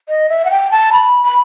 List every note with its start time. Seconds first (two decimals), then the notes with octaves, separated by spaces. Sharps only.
0.08 D#5
0.29 E5
0.45 F#5
0.51 G5
0.71 A5
0.92 B5
1.23 B5